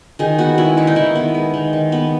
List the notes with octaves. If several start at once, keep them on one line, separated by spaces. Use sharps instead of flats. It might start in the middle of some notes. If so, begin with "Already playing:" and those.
D#3 G#4
B3 F#4
G#3 E4
D#3 E4
D#4
D#3 E4
B3
G#3
D#3
D#3
B3